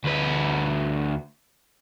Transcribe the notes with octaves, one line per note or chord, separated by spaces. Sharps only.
D2 B4